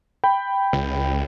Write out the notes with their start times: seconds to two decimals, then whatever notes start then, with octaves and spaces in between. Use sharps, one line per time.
0.24 G5 B5
0.73 C#2